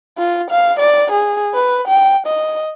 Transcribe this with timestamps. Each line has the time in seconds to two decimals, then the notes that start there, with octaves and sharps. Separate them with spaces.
0.18 F4
0.51 F5
0.80 D5
1.12 G#4
1.54 B4
1.88 G5
2.27 D#5